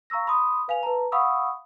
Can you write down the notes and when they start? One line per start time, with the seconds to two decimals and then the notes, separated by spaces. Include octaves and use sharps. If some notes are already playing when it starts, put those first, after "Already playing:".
0.10 F5 A#5 C#6 E6 A#6
0.27 B5 C6 D#6
0.68 B4 F5 G#5 F7
0.83 B4 A5 A#5
1.12 F5 F#5 B5 C#6 D#6 E6